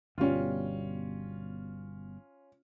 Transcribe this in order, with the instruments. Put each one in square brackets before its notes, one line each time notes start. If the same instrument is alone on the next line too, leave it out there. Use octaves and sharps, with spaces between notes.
[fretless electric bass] G1 B2 G3 [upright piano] C#4 F4